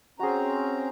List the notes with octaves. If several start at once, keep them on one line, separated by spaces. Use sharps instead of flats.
C4 C#4 F#4 G#4 A#5